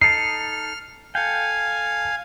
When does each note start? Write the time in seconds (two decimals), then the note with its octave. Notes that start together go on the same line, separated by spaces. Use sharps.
0.02 D#4 A4 F6 C7
1.15 A4 F5 G5 G#5